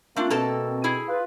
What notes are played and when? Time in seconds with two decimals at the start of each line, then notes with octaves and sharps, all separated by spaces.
0.16 A3 A#3 C4 D4 F4
0.30 B2 A#3 C4 A4 A5
0.84 E4 G#4
1.07 F4 B4